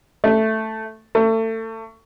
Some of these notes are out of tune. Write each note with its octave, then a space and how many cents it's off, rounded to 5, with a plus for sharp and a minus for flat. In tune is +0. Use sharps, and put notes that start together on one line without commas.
A3 +0
A3 +30